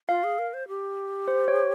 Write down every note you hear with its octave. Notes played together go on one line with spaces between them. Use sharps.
F4 F5
G#4
A#4
C5
G4
C5
C#5